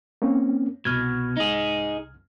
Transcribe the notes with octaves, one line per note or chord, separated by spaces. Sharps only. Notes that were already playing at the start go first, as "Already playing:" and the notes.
A#3 C4 C#4
C2 B2 F6 G#6
D#4 G#4